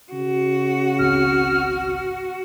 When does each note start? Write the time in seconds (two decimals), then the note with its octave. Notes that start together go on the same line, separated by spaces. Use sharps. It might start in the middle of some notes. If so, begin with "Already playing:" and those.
0.12 C#3 F#4
0.99 G#1 C#2 C4 F6